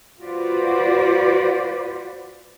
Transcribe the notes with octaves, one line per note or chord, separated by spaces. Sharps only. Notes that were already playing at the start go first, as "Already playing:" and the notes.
F4 F#4 B4 C5 D5